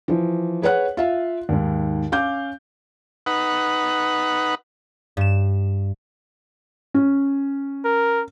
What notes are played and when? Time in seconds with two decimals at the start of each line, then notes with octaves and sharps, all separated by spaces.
0.08 E3 F3
0.62 G#4 B4 C#5 F#5 F#6
0.97 F4 E5 F5
1.49 D#2 G#2
2.12 C#4 F5 D6 G6
3.26 D#4 B4 F#5
5.17 G2 E7
6.94 C#4
7.85 A#4